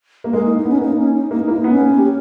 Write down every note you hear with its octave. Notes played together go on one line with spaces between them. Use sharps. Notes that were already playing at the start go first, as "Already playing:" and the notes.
A#3
G#3 A#4
A#3 D#4
D#4
B3
C#4
A#3 D#4
C#4
D#4
A#3 D#4
A#3 E4
D#4
B3
C#4
A#3
G4